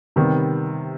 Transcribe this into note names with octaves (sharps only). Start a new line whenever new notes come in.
C3 D#3 G3 B3